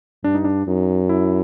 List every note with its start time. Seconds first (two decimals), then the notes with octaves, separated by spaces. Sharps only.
0.24 G2 D4
0.35 D#4
0.45 D4
0.68 F#2 D#4
1.09 E4